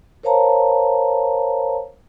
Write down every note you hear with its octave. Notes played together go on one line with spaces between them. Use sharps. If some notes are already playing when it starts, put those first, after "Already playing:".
A#4 C5 C#5 F5 A5 A#5